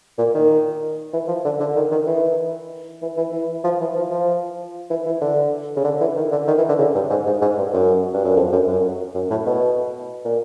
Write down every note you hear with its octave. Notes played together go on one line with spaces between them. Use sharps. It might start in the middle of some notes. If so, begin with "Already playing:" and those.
A#2
D#3
E3
F3
D3
D3
D#3
D#3
E3
E3
E3
E3
F3
E3
F3
F3
E3
E3
D3
C#3
D3
E3
D#3
D3
D#3
E3
D3
C#3
G2
G#2
G#2
G#2
G2
F#2
G2
F#2
F2
F#2
F#2
F#2
A2
B2
A#2